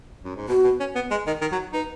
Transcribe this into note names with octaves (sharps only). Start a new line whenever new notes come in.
F#2
G#2
B2 F#4
B2
C#4
B3
G#3 D#5
D#3 D#5
D#3
F#3
D#4 B4